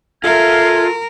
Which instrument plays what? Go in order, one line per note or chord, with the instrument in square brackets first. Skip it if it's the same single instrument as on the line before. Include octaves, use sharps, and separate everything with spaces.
[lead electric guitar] F4 [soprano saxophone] A4 [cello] A#4 [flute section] E5 F6 G#6